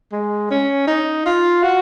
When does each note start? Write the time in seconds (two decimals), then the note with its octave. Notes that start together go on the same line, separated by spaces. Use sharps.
0.12 G#3
0.51 C#4
0.87 D#4
1.26 F4
1.63 F#4